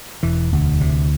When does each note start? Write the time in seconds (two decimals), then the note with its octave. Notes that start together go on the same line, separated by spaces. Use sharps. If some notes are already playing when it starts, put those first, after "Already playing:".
0.23 E1 E3
0.53 D2
0.81 C3